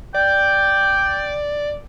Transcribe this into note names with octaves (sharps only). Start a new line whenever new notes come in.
D5 G5